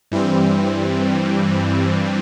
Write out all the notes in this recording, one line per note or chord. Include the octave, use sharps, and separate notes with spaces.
G2 E3 G3 C4